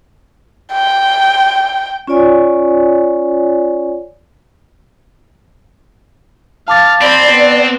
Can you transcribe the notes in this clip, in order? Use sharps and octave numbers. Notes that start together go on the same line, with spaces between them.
G5
C#4 F4 C#5 D5 G#5
F5 A5 D6 A6
C4 C5 D5 B5
B3